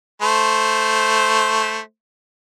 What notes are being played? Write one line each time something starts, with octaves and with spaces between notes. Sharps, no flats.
A3 C5